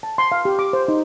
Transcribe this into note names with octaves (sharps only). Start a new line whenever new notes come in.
A5
C6
F5
G4
D6
C5
D#4